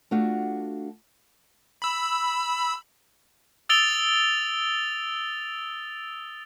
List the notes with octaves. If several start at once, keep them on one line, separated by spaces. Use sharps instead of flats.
A3 D4 F4 F#4
B5 E6
D#6 E6 A6 D7 F7 G7